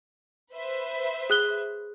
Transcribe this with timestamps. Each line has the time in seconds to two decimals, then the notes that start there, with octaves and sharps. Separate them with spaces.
0.52 B4 C5 E5
1.30 G#4 F#6 G7